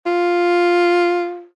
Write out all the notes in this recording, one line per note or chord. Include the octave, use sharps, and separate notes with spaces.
F4